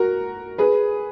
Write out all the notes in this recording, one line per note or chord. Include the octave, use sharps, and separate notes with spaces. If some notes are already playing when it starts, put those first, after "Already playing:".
Already playing: F#4 A#4
G#4 B4